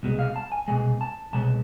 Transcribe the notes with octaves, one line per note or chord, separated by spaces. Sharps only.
C2 B2 G#3
F5
A5
G#5
C2 B2 G#3 G#5
A5
C2 B2 G#3 A5